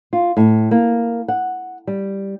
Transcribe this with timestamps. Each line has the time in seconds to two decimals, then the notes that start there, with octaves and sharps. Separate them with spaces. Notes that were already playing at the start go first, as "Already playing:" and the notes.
0.13 F4
0.37 A2
0.71 A#3
1.28 F#5
1.87 G3